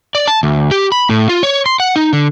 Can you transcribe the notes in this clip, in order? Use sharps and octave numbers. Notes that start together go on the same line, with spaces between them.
D5
A5
D2
G4
B5
A2
F4
C#5
C6
F#5
D#4
D3